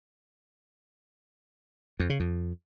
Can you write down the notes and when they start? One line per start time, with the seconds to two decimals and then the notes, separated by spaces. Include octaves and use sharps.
2.00 F2
2.10 C#3
2.20 F2